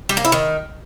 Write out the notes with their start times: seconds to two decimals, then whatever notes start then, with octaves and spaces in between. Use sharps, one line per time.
0.09 G3
0.17 A#3
0.25 E4
0.32 D#3